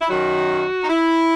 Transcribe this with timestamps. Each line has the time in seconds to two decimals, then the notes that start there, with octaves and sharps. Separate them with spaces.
0.01 E4
0.08 F#2 D#3 F#3 F#4
0.84 D#4
0.89 E4